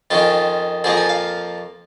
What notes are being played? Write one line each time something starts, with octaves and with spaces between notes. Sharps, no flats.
F2 D#3 C#4 F4
F2 F3 A#3 G#4
G#5
F5